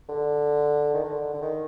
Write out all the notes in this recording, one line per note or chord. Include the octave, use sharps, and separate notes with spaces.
D3
D#3
D3
D3
D#3